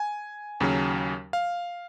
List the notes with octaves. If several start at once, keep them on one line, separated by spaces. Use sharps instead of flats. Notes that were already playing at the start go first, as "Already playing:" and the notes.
Already playing: G#5
D#2 C#3 F#3 C#4
F5